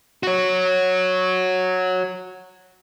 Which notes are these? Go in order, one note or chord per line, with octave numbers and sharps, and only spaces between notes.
F#4 C#5